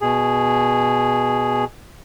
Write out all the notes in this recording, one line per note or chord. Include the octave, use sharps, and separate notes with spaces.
B2 G#4